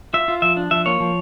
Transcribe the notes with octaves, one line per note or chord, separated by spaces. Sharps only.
F4 E5
F4
F3 E5
D4
F3 E5
A#3 C#5
F3